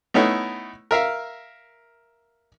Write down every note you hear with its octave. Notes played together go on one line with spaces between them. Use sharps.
A3 B3 C#4 D#4 E4
A#4 E5 F5